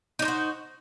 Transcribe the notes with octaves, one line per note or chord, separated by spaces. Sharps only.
D4 D#4 F#4 C5